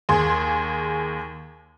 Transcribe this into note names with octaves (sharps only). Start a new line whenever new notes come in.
D#2 G#4 C6